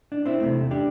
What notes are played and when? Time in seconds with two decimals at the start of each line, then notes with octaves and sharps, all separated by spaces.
0.12 D4
0.26 C4 E4
0.40 E2 C3 A3
0.71 D4 G4